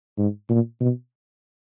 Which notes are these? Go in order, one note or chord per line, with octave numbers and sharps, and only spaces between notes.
G#2
A#2
B2